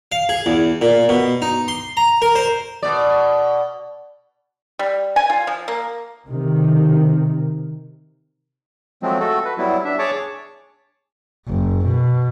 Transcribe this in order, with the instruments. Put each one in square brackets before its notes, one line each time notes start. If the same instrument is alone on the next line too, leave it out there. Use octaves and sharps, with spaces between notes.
[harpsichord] F5
G#4
E2
A#2
B2
D#4
C6
A#5
A#4
C5
[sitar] B2 D5
[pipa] G3
G#5
F4
F3
A#3
[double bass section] C3 D#3
[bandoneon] F3 F#3 G#3 A3 C4
A3 F#4 A4
B4
F#3 G3 B3 E4
D4 E5
G#4 C#5 A5 C#6 D6
[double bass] F#1
B2